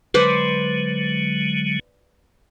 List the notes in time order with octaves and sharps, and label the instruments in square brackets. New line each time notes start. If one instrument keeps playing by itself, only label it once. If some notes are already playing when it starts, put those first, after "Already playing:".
[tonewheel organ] D3 F#3 G#3 [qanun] B4 C5 D5